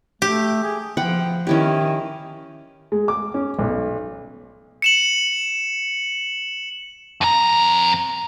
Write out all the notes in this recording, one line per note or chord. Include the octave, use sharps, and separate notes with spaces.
A3 G4
G#4
F3 F#5 G5 B5
D#3 C#4 E4 G4
G#3
D6
C#4
B1
C#7 E7 F#7
F2 A#5